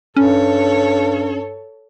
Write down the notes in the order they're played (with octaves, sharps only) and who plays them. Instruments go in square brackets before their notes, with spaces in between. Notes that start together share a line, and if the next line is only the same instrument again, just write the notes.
[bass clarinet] G2 [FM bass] C#4 [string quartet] A4 C#5